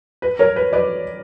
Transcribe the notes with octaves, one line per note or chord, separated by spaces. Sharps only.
B4
A#4 C#5
B4
B4 D5